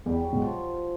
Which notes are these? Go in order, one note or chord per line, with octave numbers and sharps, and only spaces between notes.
E2 G3
F#3
B2 G#3
F3